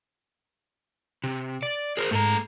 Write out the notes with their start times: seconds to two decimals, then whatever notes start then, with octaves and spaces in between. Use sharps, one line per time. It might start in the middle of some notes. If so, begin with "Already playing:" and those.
1.24 C3
1.63 D5
1.97 G#4 A#4 C5
2.11 G#2 A3 A4 A#5